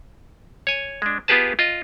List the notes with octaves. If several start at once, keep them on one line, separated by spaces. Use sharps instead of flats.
C#5 G#5
G#3 D4
B3 F4 G4 G#4 B4 A5
F4 D#5